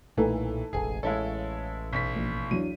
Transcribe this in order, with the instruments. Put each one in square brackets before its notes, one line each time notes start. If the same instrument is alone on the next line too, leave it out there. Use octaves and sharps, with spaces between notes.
[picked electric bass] B1 A#2 [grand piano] E3 [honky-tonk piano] A3 D#4 A4
[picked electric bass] E1 A1 [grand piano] G#4 G#5
[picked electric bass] A1 [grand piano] G#3 E4 A4 [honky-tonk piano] C#5 F5
[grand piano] B1 B6
[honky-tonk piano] A#1
[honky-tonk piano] E2 F#3 D4 [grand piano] D#7